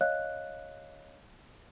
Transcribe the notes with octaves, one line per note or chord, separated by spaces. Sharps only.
C#5 D#5 F5 F#6